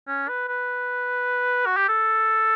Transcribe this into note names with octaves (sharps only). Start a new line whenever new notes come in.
C#4
B4
B4
F#4
G4
A4